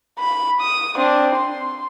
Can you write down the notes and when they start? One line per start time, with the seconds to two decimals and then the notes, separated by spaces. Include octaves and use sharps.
0.19 B5
0.61 D#6
0.97 C4 D4
1.36 C6